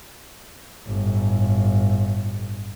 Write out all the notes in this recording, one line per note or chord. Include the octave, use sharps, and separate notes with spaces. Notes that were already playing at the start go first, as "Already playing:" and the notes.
G1 A2